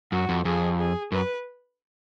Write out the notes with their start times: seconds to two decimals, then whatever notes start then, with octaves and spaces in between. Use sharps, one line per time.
0.12 F#2 F#4
0.29 F2
0.45 F2 G#4
0.79 G#4
1.12 F#2 B4